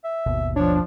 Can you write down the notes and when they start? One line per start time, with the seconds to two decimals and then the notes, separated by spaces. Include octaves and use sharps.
0.04 E5
0.26 G#1 D#2 B2
0.56 F3 D4 C#5